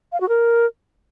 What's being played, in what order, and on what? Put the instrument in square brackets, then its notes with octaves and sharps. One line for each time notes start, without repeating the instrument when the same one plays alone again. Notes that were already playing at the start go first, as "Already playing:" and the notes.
[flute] F5
F#4
A#4